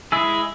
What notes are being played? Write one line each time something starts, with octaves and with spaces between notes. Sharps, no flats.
G#3 E4 G#4 E6